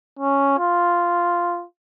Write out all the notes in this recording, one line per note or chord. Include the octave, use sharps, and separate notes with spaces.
C#4
F4